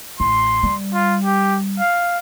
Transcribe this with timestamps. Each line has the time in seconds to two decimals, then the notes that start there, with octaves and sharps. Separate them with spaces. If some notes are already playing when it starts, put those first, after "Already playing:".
0.20 A1 C6
0.63 G3
0.94 F4
1.24 G4
1.79 F5